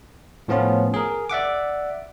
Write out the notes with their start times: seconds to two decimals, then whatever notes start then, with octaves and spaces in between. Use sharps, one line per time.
0.48 A2 F3 B3 C#4 F4
0.94 G#4 A#4
1.29 D5 E5 F#5 D6